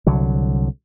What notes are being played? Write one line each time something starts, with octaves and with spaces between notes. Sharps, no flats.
C2 D3 F#3